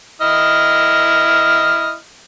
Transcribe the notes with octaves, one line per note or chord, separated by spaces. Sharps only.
E4 D#5 F6